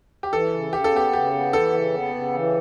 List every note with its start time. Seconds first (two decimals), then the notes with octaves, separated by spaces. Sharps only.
0.23 G4
0.32 E3 A4
0.53 C#3
0.72 C#3 G4
0.84 A4
0.94 B3 G4
1.13 C#3 G4
1.33 B3
1.53 E3 A4
1.73 C#3
1.93 B3
2.14 C#3
2.35 E3